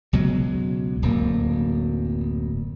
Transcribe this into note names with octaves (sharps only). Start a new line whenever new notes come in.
C#2 B2 F#3 G#3
D1 F#2 A#3